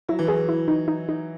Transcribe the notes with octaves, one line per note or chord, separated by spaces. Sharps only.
F#3 E4
E3
F#3 G#4
E4
D#4
D#4
D#4